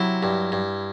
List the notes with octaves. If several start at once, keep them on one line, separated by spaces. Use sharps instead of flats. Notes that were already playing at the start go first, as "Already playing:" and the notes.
Already playing: C3 F#3 E4
G2
G2